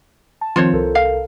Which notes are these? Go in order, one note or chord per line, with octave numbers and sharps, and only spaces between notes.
A5
D#3 F3 C4 F4 C5 C#5
C2 A4 A#4
F5